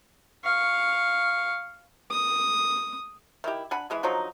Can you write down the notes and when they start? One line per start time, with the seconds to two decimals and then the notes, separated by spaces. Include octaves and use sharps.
0.44 F5 C#6
2.11 D#6
3.44 D#3 E4 G4
3.71 D4 F#5 G#5 B5
3.90 E3 G#3 G#4
4.03 D3 F3 F#3 D#4